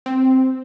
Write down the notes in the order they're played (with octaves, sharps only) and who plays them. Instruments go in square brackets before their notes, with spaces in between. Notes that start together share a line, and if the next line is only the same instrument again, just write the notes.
[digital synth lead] C4